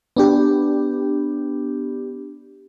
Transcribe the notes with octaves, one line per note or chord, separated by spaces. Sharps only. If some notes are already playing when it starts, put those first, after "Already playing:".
B3 D4 G4